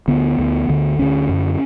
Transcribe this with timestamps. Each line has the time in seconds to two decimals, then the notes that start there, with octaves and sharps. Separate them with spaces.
0.08 D2 D3 B3
0.38 D2 D3
0.68 D2 D3
0.99 D2 D3 C#4
1.29 F#2 D3